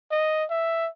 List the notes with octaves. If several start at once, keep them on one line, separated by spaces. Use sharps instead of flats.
D#5
E5